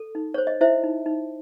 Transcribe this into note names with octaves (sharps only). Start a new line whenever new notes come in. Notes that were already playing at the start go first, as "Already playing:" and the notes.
Already playing: A4
D#4
C5 C#5
D#5
E4 C5 E5
D#4
D#4